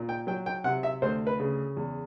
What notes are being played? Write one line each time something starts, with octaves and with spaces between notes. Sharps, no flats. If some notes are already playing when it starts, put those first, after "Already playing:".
Already playing: A#2
G5
F#3 G5
G5
C3 F#5
E5
D2 C5
B4
C#3
E2